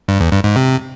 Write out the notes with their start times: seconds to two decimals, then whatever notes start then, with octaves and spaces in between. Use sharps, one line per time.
0.08 G2
0.20 E2
0.32 G2
0.44 G#2
0.56 C3